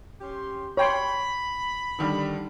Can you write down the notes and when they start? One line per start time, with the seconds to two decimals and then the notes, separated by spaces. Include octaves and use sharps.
0.21 C#4 G4 C6
0.77 C#5 G5 B5 C6
1.99 D3 D#3 G3